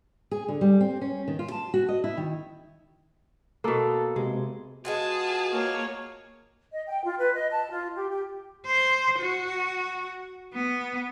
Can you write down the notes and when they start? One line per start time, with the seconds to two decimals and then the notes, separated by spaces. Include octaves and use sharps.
0.31 G#4
0.48 D3
0.61 G3
0.81 C4
1.01 C#4
1.28 D#3
1.39 F4
1.52 A5
1.74 F#4
1.89 D#5
2.04 E4
2.17 D#3
3.64 B2 A#3 A4
4.16 C3 G#3
4.85 G#3 B3 F4 F#4 G#4 A5
5.51 A#3 C#5
6.72 D#5
6.87 G5
7.04 F4
7.19 B4
7.35 D#5
7.50 A5
7.70 F4
7.94 G4
8.10 G4
8.67 C5
9.20 F#4
10.53 B3